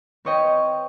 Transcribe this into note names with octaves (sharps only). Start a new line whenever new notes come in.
C4 B4 C#5 D#5 G5